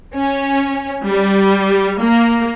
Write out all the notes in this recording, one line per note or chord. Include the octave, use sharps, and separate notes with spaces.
C#4
G3
A#3